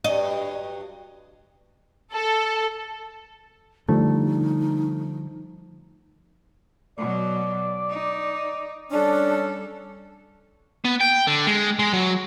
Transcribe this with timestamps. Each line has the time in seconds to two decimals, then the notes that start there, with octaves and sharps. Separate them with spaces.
0.04 G2 F#3 D#5
2.13 A4
3.89 D3 F3 G3 A3 D#4
6.98 B2 F#3 D5
7.90 D#4
8.91 G3 C#4 D4 A4
10.85 B3
11.00 G5
11.27 D3
11.47 G#3
11.79 G#3
11.93 F#3